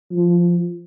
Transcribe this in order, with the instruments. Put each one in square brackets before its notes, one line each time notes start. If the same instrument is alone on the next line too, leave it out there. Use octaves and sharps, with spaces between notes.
[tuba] F3